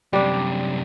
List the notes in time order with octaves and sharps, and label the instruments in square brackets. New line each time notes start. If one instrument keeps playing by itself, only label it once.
[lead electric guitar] F#2 C3 [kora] G3 D4